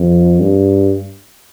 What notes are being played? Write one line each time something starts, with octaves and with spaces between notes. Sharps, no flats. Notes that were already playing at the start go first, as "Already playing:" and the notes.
Already playing: F2
G2